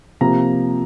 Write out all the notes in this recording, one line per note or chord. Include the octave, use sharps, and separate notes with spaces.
C3 F3 A#3 A#5